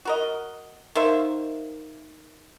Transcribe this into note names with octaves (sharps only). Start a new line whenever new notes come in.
F#4 A#4 D#5
D#3 A#3 C5 E5